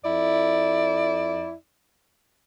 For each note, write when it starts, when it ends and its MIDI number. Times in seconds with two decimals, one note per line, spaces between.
0.05 1.55 41
0.05 1.55 64
0.05 1.55 74